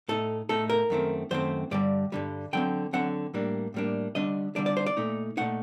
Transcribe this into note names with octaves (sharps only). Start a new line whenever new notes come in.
A2 A3 D#4 A4
A2 A3 D#4 A4
A#4
F#2 D#3 A3 C4
F#2 D#3 A3 C4 C5
G2 D3 G3 D5
G2 D3 G3
D3 F#3 C4 G5
D3 F#3 C4 F#5
A2 G3 A#3 D4
A2 G3 A#3 D4
D3 G3 D4 D#5
D3 G3 D4 D5
D5
C5
D5
A#2 A3 D#4
A#2 A3 D#4 F#5